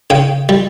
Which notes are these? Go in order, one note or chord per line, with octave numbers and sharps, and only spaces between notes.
C#3 G5
G3